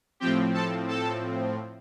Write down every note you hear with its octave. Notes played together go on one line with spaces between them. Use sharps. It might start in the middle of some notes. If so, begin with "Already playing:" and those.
A2 F3 C4 G4 G5
A4 A5
A4 A5